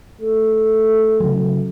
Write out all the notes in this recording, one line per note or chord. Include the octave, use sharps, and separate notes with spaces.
A3
C#3 F#3